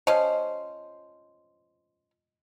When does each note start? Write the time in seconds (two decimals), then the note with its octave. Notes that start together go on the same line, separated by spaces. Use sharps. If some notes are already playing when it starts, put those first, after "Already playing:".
0.07 F3 C#4 C5 D#5